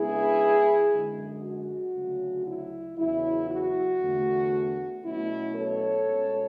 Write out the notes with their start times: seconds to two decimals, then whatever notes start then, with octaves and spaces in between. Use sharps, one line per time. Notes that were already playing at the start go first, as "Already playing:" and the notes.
Already playing: C#3 G#3 B3 D4 E4 G#4
0.91 F#2 D3 G#3
1.42 F#4
1.94 D2 C#3 F#3
2.46 E4
2.98 E2 C#3 F#3 E4
3.49 F#4
4.00 E2 D3 A3
5.03 B2 F#3 A3 C#4 E4
5.55 A4 C#5
6.07 B2 G#3 C#4